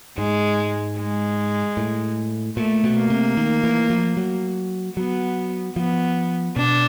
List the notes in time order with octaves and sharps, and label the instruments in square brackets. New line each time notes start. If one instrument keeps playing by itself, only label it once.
[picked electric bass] G#2 [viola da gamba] G#3
[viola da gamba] G#3
[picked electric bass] A2
[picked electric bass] A#2 [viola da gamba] A3
[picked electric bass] B2
[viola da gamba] A#3
[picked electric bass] C3
D#3
E3
F3
F#3
[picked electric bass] F#3 [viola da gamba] B3
[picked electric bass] F3 [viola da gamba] B3
[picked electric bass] B2 [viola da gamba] D4